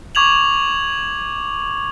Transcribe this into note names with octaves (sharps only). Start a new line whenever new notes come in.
C#6 D6 G#6 F7 F#7